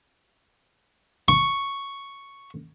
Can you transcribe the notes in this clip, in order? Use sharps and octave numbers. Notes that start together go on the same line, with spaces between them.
C#6